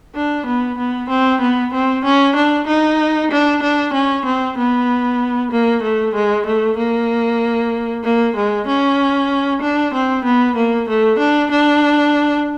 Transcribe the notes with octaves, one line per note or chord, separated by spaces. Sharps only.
D4
B3
B3
C4
B3
C4
C#4
D4
D#4
D4
D4
C#4
C4
B3
A#3
A3
G#3
A3
A#3
A#3
G#3
C#4
D4
C4
B3
A#3
A3
D4
D4